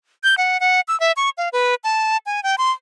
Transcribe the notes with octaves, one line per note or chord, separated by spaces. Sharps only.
G6
F#5
F#5
E6
E5
C#6
F5
B4
A5
G#5
G5
C6